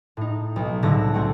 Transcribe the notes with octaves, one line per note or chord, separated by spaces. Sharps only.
A2 D#4
B1
C2 A2 D3 A4 A#6
A3 C4 C#4 F#4 C5